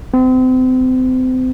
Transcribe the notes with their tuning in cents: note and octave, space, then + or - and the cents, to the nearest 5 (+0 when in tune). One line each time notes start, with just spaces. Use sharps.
C4 -35